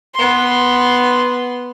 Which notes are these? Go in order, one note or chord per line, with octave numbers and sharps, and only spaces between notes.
B3 C6